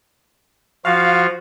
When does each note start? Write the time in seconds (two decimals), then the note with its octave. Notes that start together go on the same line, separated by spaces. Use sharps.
0.85 F3 F4 F#4 F5